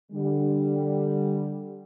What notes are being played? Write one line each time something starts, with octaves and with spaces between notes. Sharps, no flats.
D3 G3